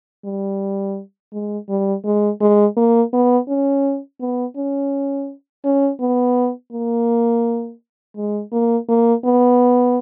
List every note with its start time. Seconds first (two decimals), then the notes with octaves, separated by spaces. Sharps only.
0.25 G3
1.33 G#3
1.69 G3
2.05 G#3
2.41 G#3
2.77 A#3
3.13 B3
3.48 C#4
4.20 B3
4.57 C#4
5.65 C#4
6.00 B3
6.72 A#3
8.16 G#3
8.52 A#3
8.89 A#3
9.24 B3